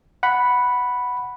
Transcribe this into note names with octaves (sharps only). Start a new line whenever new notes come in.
F#5 B5